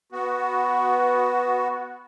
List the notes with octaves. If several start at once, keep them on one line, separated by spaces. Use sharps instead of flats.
B3 F#4